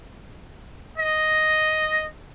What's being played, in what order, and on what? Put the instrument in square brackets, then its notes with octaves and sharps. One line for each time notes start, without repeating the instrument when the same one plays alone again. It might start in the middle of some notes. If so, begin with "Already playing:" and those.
[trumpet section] D#5